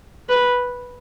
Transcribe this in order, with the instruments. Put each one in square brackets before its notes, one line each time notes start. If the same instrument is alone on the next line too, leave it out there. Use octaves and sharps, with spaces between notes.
[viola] B4